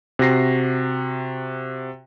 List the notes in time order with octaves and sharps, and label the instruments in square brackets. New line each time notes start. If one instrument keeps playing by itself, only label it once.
[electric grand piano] C3 F#4 A#6 C7